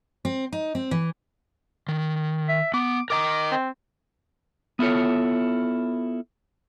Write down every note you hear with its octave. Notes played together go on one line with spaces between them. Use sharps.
C4
D#4
C4
E3
D#3
E5
B3 D6
A#4 D#5 A#5 D6
C4
B3 E4 F4 A4 C#5